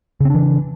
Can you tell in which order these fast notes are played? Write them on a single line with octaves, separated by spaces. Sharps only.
C#3 C4 D4 E3